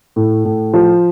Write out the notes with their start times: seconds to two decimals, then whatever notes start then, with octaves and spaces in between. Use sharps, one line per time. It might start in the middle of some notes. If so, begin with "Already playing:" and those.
0.16 A2
0.45 A2
0.74 F3